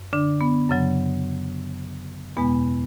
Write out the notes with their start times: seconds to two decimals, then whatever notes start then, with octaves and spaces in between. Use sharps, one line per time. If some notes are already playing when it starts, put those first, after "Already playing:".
Already playing: F#2
0.13 D3 D4
0.41 B3
0.69 F#2 C#3 F#3
2.37 E2 B2 G#3 B3